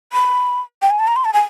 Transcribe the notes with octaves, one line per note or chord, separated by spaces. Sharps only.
B5
G5
G#5
A5
A#5
C6
A5
G#5